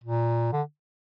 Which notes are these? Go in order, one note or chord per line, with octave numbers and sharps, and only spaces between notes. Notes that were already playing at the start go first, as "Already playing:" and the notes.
A#2
D3